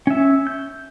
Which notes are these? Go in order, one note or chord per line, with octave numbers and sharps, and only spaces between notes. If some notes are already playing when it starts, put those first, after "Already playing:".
C#4 E5
G6